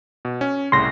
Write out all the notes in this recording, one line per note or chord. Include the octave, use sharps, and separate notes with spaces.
B2
C#4
C2 A2 C#3 C6 A#6